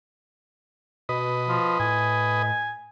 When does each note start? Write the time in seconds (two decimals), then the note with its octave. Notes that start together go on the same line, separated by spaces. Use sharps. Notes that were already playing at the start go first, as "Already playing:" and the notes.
1.09 B2 B4 D#5
1.48 F3
1.80 A2 G#5